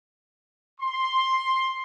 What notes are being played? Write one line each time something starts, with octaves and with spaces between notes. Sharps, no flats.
C6